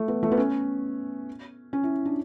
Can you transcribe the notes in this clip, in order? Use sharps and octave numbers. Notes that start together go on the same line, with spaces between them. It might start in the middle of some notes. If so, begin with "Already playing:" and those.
Already playing: A3
B3
A3
B3
C#4
C#4
E4
D4